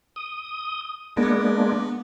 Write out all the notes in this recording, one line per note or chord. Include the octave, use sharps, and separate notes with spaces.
D#6
G#3 A#3 B3 D4